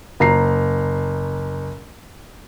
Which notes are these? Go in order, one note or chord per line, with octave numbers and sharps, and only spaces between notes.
F#1 A#5 C7